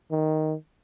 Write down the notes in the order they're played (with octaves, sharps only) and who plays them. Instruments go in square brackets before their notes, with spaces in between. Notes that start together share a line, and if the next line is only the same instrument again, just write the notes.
[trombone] D#3